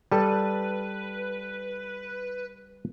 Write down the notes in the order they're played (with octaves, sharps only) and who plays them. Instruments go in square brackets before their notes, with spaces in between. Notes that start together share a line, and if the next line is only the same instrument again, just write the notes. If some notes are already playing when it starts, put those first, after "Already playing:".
[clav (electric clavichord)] G3 A4 [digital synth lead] B4